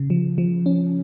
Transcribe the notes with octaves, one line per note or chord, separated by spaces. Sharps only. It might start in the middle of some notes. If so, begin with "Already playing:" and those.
Already playing: C#3
F3
F3
C#4